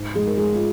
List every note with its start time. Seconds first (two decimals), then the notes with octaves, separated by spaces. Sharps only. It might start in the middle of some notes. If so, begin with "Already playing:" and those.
Already playing: G#2
0.15 G#3 G#4
0.22 G#2
0.27 A#4
0.37 G#3 G#4
0.54 F4